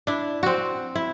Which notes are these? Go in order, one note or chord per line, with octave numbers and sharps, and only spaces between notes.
D4 E4
C4 F#4
E4